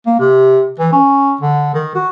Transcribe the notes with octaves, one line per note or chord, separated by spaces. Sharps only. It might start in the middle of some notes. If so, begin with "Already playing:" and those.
A#3
C3
E3
C#4
D3
D#3
F#4